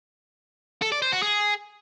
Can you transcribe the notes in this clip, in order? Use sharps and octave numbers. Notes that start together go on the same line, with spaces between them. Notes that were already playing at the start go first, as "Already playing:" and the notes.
A4
D5
C5
F#4
G#4